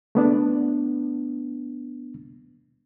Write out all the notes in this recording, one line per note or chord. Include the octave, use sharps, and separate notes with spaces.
A3 B3 D4